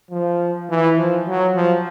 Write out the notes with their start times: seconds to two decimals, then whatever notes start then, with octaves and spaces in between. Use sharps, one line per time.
0.11 F3
0.69 E3
0.97 F3
1.28 F#3
1.56 F3